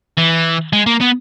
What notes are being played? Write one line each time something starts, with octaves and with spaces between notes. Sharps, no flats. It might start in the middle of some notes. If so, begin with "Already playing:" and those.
E3
G#3
A#3
B3